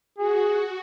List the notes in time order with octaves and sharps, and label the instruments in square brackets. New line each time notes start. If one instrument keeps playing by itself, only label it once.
[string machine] F#4 [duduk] G#4